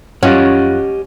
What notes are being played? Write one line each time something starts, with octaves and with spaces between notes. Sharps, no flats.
F#2 C#4 F4 G4 D#5 F#5 F#6